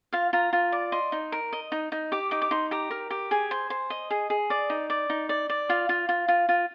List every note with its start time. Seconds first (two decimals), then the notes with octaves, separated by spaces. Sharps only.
0.13 F4 F5
0.33 F4 A#5
0.53 F4
0.72 D5
0.92 D#5 C6
1.12 D#4
1.32 A#4
1.53 D#5
1.72 D#4
1.92 D#4
2.12 G4 D6
2.31 D#4 D6
2.42 D6
2.51 D#4 C6
2.71 G4 A#5
2.91 A#4
3.11 G4
3.31 G#4 G#5
3.51 C5
3.70 C5
3.90 D#5
4.11 G#4
4.30 G#4
4.50 D5
4.70 D#4
4.90 D5
5.10 D#4
5.29 D5
5.49 D5
5.69 F4 F5
5.89 F4
6.09 F4
6.28 F4
6.49 F4